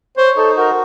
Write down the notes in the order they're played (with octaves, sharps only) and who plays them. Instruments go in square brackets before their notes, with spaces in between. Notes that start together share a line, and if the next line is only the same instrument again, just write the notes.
[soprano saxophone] C5 [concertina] C#5
[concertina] D#4 [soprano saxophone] A4
[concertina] F#4 [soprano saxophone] A#4